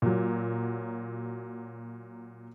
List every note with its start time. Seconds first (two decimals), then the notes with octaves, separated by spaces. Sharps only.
0.02 A#2 F#3